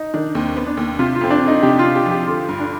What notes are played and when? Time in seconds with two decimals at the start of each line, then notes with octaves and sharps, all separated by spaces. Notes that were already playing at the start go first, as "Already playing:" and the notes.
Already playing: D#4
0.14 D#3 D4
0.35 D#2 C4
0.57 B3
0.67 D4
0.77 D#2
0.99 C3 F4
1.15 F4
1.21 F2 C4
1.30 D4
1.41 F2
1.48 D#4
1.62 C3 G4
1.79 F4
1.85 C3
1.95 G4
2.06 F3
2.11 G4
2.27 D3 F4
2.49 G2
2.60 D4